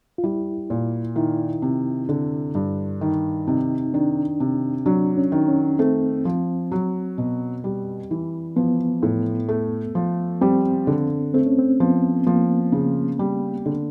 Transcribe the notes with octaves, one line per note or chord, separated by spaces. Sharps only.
F4
G3 E4
A#2
D#3 E4
C3
D3
G2
D#3
C3 D#4
D#3 D4
C3
F#3 D4
C#4
D#3
C#4
A3 C4
F3
F#3
B2
G3
E3
F3 B3
A2
A3
F3
G3 C4
D3
A3 C4
C#4
C4
F3 B3
F3 A#3
C#3
G3
D3